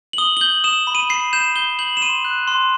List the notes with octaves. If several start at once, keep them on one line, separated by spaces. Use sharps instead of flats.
F#7
D#6 G7
G7
G6 F#7
D#6 E7
B5
D#7
G6 C7
G6 E7
G6 G7
G6 F#7
E7
C6 D#7
F#6
C6